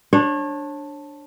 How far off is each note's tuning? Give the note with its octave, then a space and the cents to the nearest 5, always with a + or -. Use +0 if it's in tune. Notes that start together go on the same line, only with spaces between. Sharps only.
D4 +0 C#5 -30